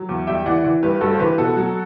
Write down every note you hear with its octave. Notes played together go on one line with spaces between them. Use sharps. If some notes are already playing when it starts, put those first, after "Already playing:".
Already playing: F#3
E2
G3 E5 G5
E3 D5 F#5
E3
G2 G4 B4
G2 F#4 A4
C5
E3 G4 B4
B2 F#4 A4
F#3